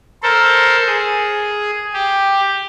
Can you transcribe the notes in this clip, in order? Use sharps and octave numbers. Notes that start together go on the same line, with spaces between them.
A4 A#4 C5
G#4
G4